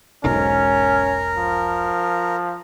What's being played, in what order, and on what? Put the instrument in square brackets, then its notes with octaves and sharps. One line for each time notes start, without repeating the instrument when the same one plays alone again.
[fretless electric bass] E1 B1 G#2 [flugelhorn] C#4 [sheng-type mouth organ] A#4
[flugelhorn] F3